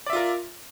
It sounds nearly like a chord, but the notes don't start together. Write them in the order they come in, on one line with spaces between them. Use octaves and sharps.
D5 E5 F4 A#4